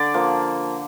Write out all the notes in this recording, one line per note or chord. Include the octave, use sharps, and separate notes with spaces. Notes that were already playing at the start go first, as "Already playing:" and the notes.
Already playing: D3 D5
F3 A#3